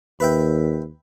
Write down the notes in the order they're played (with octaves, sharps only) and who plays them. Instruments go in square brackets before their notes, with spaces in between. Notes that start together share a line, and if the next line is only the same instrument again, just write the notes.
[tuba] D#2 [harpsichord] B4 E5 G5